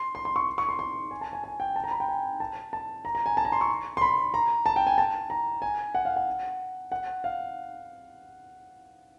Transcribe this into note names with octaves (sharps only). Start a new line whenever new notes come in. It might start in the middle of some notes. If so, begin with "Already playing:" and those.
Already playing: C6
C6
C6
C#6
C#6
C6
C6
G#5
A5
G#5
G#5
G5
A5
A#5
B5
G5
G#5
A5
A5
A#5
A#5
G#5
A5
A#5
C6
C#6
C6
B5
A#5
A5
G5
G#5
A5
A#5
G#5
F#5
F5
F#5
F#5
F5